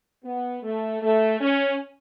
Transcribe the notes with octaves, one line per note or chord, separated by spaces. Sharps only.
B3
A3
A3
C#4